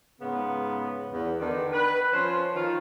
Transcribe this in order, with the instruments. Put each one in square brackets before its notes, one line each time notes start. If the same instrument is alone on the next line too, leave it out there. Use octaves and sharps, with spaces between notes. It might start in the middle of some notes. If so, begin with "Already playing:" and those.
[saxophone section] G#2 C#3 B3
E2 B3
D3 D#3 D4 B4 D5
B4
F3 C#4 C5
D#3 F4